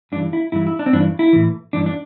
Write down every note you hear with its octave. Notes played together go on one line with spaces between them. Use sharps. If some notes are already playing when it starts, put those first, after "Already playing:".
G2 E3 D4
E4
G2 E3 E4
E4
D4
C4
G2 E3 D4
E4
A2 E3
G2 E3 D4
D4